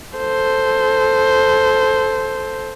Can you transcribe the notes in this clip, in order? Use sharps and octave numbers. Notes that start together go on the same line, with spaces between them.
A4 C5